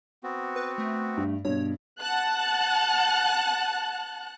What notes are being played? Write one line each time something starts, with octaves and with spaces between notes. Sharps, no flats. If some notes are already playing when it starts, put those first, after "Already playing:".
B3 C4 F#4
B4
A3
G2
G2 B2 C#5
F#5 A5 F#6